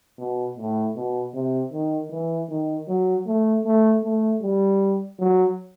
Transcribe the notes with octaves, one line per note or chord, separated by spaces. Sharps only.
B2
A2
B2
C3
D#3
E3
D#3
F#3
A3
A3
A3
G3
F#3